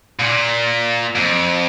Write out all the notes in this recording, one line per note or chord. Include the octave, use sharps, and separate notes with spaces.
A#2
F2